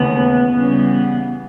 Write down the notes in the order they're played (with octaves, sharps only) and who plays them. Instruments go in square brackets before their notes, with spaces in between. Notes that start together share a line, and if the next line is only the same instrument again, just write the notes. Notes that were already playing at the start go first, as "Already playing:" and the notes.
Already playing: [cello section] D#2 C#3 E3 A3 [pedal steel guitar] B3
[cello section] C#3 E3 G3